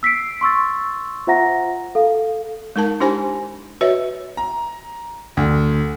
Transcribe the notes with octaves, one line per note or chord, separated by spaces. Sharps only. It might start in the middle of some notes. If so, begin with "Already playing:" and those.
E6 B6 C7 D7
C6 C#6 E6 A6
F4 C5 E5 F#5 A#5 A#6
A4 F5
G#3 D#4 A#4 A5
D4 E4 G4 C5 G#5 B5
F#4 B4 C#5 D#5 E5
A#5
D2